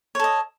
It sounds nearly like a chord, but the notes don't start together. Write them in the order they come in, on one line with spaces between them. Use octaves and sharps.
C#5 A4 D#5